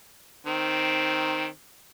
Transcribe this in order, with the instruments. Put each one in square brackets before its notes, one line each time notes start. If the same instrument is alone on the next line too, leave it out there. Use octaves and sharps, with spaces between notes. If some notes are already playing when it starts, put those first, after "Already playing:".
[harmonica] D#3 C4